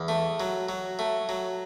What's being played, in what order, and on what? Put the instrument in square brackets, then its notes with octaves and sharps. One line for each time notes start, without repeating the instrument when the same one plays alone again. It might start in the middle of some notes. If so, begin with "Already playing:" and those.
Already playing: [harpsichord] E2
A3
F#3
F#3
A3
F#3